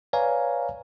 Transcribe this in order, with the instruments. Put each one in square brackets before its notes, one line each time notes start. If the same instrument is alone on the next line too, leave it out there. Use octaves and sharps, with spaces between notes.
[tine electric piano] B4 C#5 D5 F5 G#5 A#5